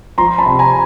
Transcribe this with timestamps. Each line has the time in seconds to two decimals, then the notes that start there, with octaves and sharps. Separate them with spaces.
0.18 F3 A#5 C6
0.38 A5 B5
0.46 C3
0.59 G#5 A#5